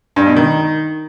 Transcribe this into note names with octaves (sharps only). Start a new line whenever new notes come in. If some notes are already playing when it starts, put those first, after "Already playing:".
G2
B2
D#3